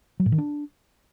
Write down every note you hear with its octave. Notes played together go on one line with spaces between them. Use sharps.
F#3
A2
D#3
D4